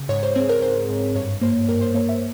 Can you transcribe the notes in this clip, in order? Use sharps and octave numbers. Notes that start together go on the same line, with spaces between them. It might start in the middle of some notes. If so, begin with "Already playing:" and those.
Already playing: C#3
G#2 C#5
C5
C4 G#4
A#4
G#2 C5
G#2
G2 C#5
A#3 C5
G2 A#4
C5
A#3 C#5
E5